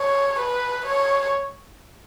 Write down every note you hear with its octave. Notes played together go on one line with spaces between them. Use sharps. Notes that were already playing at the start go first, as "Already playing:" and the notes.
Already playing: C#5
B4
C#5